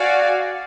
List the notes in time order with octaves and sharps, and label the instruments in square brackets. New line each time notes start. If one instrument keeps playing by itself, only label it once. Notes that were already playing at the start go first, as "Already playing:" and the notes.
Already playing: [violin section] F#4 D5 F5 G#5